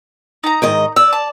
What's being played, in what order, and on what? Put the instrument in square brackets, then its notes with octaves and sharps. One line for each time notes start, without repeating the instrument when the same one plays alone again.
[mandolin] D#4 A#5
[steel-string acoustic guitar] G#2 D#3 D#5
[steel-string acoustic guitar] D5 [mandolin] E6
[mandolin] A5